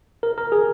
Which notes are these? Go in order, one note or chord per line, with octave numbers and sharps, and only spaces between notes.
A#4
A#4
G#4